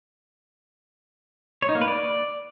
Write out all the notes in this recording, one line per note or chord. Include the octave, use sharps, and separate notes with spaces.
C#5
D#4
A#3
B4
D5